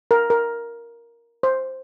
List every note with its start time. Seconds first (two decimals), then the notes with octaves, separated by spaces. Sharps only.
0.11 A#4
0.30 A#4
1.43 C5